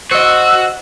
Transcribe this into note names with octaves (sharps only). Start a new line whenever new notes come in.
F#4 C5 D#5 E6